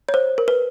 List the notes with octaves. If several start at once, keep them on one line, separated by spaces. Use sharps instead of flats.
C#5
C5
A#4
B4